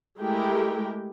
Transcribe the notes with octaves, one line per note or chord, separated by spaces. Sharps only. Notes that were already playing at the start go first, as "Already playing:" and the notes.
G#3 A3 E4 G4 A#4 G5